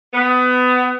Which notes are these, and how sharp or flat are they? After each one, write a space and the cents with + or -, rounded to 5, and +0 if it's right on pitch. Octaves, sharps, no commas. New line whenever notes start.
B3 +25